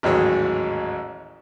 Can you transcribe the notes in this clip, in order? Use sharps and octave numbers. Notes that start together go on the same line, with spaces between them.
A1 D#2 G#2 F#3 G#4 C#5